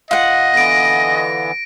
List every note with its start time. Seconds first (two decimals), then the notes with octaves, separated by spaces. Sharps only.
0.11 F4 D#5 F#5
0.54 D3 E3 B3 A#6 D7